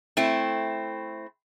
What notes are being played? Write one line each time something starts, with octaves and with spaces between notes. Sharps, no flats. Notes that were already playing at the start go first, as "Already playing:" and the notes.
A3 C4 E4